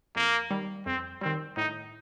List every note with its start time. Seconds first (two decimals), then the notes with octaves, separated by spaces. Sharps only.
0.16 F2 A#3
0.51 D#3 G3
0.86 F2 C4
1.21 D#3 G3 C4
1.57 A2 D#4